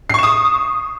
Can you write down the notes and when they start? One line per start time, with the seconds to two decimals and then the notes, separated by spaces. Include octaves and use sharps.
0.10 C7
0.14 C#6
0.19 E7
0.23 D#6